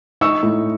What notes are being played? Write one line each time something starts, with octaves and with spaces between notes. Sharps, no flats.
D#4 C#6 E6
A2